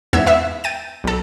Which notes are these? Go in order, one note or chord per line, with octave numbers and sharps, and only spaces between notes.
E2 G#2 B3 E5 G#6
B3 E5 E6
G5 A6 D#7
B1 A4